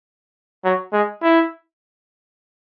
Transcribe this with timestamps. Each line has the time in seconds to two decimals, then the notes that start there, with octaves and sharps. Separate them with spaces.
0.65 F#3
0.93 G#3
1.23 E4